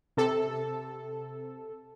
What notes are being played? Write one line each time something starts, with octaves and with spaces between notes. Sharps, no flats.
C3 A4